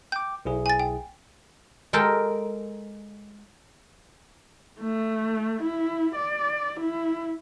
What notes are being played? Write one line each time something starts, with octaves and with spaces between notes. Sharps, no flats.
G5 D6 G6
B1 E4 G#4
G#5 A6
G5
G#3 A4 A#4 G5 A5
A3
E4
D5
E4